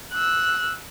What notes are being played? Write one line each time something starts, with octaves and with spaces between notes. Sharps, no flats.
E6 F#6